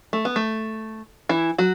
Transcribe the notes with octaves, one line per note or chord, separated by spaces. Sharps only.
A3
B3
A3
E3 E4
F#3 F#4